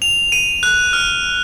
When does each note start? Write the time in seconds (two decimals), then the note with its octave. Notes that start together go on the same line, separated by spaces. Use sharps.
0.02 F7
0.32 D#7
0.63 F#6
0.93 F6